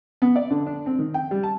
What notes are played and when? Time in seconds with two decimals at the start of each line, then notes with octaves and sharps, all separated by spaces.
0.22 B3
0.36 D5
0.51 D3
0.66 D4
0.86 C4
0.99 D#3
1.14 G5
1.31 G3
1.43 A5